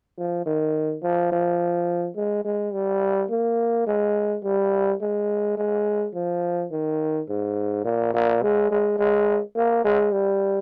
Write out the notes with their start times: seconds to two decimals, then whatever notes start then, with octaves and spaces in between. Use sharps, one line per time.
0.18 F3
0.46 D#3
1.03 F3
1.32 F3
2.16 G#3
2.45 G#3
2.73 G3
3.31 A#3
3.87 G#3
4.43 G3
5.01 G#3
5.57 G#3
6.14 F3
6.71 D#3
7.29 G#2
7.85 A#2
8.14 A#2
8.42 G#3
8.71 G#3
8.98 G#3
9.56 A#3
9.84 G#3
10.12 G3